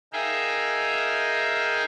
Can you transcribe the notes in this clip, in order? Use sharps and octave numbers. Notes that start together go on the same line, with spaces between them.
D#4 G#4 A#4 E5 F5 G5